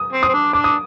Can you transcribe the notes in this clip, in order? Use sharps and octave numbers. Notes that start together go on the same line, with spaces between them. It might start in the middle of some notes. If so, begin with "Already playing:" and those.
Already playing: D#6
C4
D#6
C4
D4
D4 D6
D#6